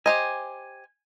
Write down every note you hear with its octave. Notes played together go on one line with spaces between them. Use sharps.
G4 C5 D#5 G#5